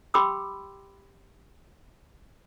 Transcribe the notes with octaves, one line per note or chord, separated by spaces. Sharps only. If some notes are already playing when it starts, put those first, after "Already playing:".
G4 G5 B5 C6 D6 E6